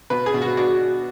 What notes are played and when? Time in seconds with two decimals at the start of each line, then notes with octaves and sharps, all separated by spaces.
0.10 B2 B4
0.26 G#4
0.34 B2
0.42 F#4
0.57 D4 F#4